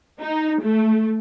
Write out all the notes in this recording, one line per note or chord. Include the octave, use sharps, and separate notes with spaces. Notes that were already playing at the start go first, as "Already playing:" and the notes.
D#4
A3